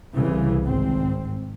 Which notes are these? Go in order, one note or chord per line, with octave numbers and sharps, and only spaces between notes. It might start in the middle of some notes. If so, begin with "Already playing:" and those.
C2 C#3 E3
G#1 C4